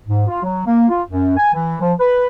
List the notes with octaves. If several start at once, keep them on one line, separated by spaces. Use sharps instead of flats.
G#2
F4
F#3
A#3
F4
F#2
G#5
E3
F3
B4